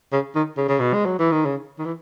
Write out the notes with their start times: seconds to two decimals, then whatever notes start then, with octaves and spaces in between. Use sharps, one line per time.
0.13 C#3
0.35 D#3
0.57 C#3
0.69 C#3
0.80 B2
0.94 G#3
1.06 F#3
1.19 E3
1.32 D#3
1.45 C#3
1.78 D#3
1.85 E3